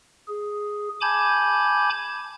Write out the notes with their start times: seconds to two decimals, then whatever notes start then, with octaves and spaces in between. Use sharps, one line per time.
0.27 G#4
1.01 G#5 A5 B5 D6 G6 G#6